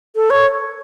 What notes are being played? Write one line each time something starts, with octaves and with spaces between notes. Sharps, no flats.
A4
C#5